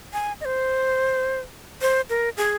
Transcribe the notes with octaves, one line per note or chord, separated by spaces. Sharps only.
G#5
D#5
C5
C5
A#4
G#4